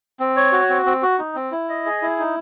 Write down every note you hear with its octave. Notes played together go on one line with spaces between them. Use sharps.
C4
C#5
F#4
C4
C4
F#4
D#4
C4
E4
D#5
G#4
E4
D#4